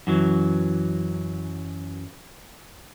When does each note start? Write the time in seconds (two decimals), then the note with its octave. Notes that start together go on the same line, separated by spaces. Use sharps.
0.07 F#2 E3 F#3